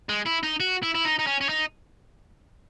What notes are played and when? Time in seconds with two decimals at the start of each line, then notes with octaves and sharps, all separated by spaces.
0.09 G#3
0.27 E4
0.43 D#4
0.60 F#4
0.83 E4
0.94 E4
1.04 D#4
1.19 D#4
1.27 C#4
1.41 C#4
1.49 D#4